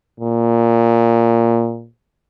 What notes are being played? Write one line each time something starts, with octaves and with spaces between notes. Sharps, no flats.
A#2